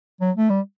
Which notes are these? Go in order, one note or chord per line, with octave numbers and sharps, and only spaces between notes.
F#3
A3
G3